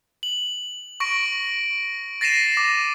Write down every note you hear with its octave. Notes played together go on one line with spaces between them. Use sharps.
F#7
C#6 A#6 D7
A6 A#6 C7 D#7 E7
D6